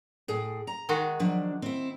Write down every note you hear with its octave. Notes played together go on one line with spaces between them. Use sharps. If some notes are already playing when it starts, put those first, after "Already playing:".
A2 G#4
A#5
D#3 G#3 F#4
F3 F#3 D4
C4 E4